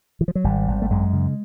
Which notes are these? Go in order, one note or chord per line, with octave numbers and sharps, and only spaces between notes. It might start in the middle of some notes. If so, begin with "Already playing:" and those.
E3
F3
F#3
G#1 G3
G#1
A3
F#2 G#3
C#3